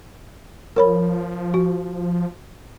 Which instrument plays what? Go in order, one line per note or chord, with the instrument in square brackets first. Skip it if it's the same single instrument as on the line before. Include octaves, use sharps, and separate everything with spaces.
[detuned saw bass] F3 [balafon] A#4 C#5 B5
[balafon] F#4